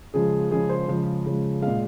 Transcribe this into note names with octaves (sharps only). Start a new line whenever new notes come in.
C#3 F3 G#3 G#4
C#3 F3 G#3 G#4
C5
C#3 F3 G#3
C#3 F3 G#3
A#2 G#3 F5